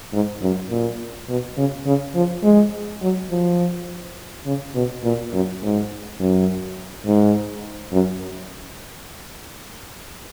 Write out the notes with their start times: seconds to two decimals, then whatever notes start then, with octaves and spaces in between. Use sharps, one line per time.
0.13 G#2
0.42 F#2
0.70 A#2
1.29 B2
1.57 C#3
1.86 C#3
2.15 F3
2.43 G#3
3.02 F#3
3.30 F3
4.46 C#3
4.75 B2
5.04 A#2
5.33 F#2
5.62 G#2
6.20 F#2
7.06 G#2
7.92 F#2